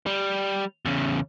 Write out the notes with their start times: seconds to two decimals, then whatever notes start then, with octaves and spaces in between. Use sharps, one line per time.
0.06 G3
0.85 E2 C#3